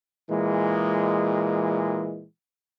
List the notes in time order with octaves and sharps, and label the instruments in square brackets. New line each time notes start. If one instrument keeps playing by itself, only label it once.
[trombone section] A#2 E3 G#3